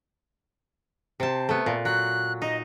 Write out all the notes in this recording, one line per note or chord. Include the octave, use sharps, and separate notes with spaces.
C3 C5 A5
A3 B3
A#2
F#3 F#6
D#4 D#5